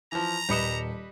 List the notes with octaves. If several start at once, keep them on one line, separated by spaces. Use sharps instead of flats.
E3 F3 A#5
D#1 G3 B4 D#5 C#7 E7